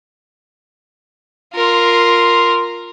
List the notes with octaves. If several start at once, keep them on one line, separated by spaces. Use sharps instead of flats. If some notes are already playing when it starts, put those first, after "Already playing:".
F4 A#4 C6